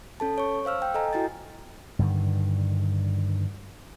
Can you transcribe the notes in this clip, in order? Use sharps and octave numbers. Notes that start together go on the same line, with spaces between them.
C#4 A4 A5
C#5 C#6
C5 F5 E6 F6
G5
A4 D#5 G#5 A#5
E4 F#4 G5 A#5 A6
G2 D3 D#3